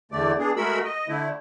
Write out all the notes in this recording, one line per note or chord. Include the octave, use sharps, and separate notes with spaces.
E2 D3 A3 D5
B3 D4 G#4
G#3 A3 F#4 A#4 B5 E6
D#5
D3 A3 E4